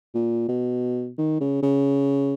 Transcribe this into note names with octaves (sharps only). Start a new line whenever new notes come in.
A#2
B2
D#3
C#3
C#3